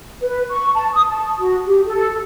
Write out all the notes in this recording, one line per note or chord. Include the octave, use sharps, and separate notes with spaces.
B4
C#6
A5
D#6
A5
F#4
G4
A4